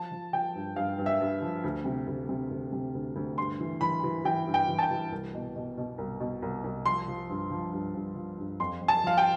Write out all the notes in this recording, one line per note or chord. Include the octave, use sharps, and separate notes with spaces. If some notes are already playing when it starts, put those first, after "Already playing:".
Already playing: F3 A5
F3
F3 G5
G2
G2 F5
G2
E5
G2
F3
D2
C3
D2
C3
D2
C3
D2
D2
G2 C6
E3
E3 B5
E3
E3 G5
G2
G5
E3
A5
G5
E3
C2
B2
B2
B2
C2
B2
C2
C2
F3 C6
F3
G2
F3
G2
G2
F3
G2
F2 C6
F2
A5
F3 F5
G5